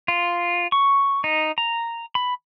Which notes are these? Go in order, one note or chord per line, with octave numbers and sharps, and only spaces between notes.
F4
C#6
D#4
A#5
B5